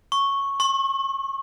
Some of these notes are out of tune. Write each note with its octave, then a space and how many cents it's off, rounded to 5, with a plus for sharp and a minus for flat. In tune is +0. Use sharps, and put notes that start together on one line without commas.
C#6 -5
C#6 -40